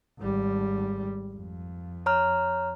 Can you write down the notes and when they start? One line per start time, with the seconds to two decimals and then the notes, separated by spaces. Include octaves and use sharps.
0.19 G#1 G3
1.34 F2
2.06 C#5 A#5 F6